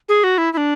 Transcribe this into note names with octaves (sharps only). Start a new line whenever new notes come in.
G#4
F#4
E4
E4
D4